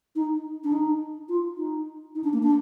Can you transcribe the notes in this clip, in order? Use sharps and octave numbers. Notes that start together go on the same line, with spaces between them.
D#4
D4
D#4
F4
D#4
D#4
D4
A#3
D4